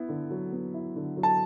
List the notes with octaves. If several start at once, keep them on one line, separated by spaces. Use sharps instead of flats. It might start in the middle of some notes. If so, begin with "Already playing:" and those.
Already playing: B3 E4
D3
F#3
B3
E4
D3
F#3
A5